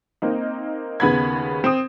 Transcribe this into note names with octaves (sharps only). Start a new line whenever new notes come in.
A#3 C4 D#4
D#2 C#3 B3 B5 G#6
C4 D#6